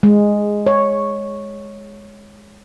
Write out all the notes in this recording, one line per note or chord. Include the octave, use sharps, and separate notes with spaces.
G#3
C#5